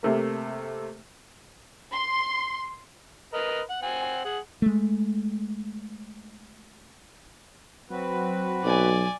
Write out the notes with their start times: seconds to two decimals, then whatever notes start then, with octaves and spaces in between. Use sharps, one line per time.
0.03 C3 A3 A#3
1.93 C6
3.34 A#4 B4 D#5
3.70 F#5
3.82 C4 F#5 G#5
4.24 G#4 F#5
4.62 G#3 A3
7.90 F#3 C4 F#4 B4
8.64 B1 D5 G#5